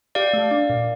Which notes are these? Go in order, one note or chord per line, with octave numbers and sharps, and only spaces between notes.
G4 D5 F5
A3
D4
A#2